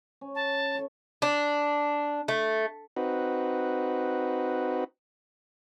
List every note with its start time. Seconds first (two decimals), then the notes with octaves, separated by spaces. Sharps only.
0.21 C#4
0.35 A5
0.75 A4 C#5
1.22 D4
2.28 A3
2.96 C4 D#4 F#4 B4